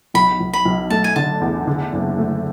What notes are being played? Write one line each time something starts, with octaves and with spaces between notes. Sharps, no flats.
B1 B5
B1
B5
B1
A3 A5
G#5
D3 A5
E2
D3
F#1
A3